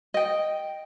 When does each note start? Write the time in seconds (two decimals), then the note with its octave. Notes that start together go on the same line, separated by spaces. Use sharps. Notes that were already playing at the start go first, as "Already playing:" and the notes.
0.14 D#5 G5